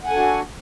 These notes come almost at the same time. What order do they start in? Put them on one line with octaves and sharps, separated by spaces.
F#5 G#5 A4 D4 F#4